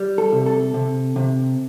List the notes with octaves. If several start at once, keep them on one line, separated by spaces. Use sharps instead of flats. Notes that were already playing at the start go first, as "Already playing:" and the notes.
Already playing: G3
A4
C3
A4
C3
C3